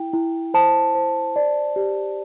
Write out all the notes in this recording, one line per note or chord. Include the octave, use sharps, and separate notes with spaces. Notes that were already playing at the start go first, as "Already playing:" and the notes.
Already playing: E4 G5
E4
C5 A5
C5
D5
G4